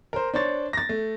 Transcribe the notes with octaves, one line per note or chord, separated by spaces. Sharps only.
A#4 C5
D4 C5 C#5 A6
A6 A#6
A3